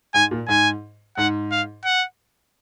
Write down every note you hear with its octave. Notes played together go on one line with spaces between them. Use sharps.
G#2 G#5
A#2
G#2 G#5
G#2 F#5
F5
F#5